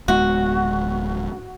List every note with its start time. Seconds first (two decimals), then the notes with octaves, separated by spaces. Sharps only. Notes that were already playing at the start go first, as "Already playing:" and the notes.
0.08 D1 G#3 B3 F#4